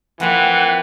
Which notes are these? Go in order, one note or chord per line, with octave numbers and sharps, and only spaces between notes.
F2 E3 A#3 C4 F#5